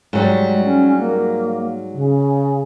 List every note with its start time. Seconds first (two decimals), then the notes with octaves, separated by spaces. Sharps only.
0.13 G#2 F#3 G3
0.52 G#3
0.65 C#4
0.99 A#3
1.93 C#3